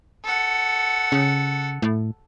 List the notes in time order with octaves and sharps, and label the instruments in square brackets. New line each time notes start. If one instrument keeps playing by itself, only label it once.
[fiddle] A4 F#5
[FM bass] C#3
A2